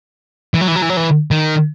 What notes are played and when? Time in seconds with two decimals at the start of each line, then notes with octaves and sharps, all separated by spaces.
0.54 E3
0.61 F#3
0.68 E3
0.76 F#3
0.82 E3
0.89 F#3
0.97 E3
1.31 D#3